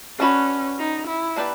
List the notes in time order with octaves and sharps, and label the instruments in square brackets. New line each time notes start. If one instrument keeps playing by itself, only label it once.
[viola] C#4 [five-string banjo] D4 F#4 B4
[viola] D#4
E4
[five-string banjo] A#3 D4 G4 B4 D5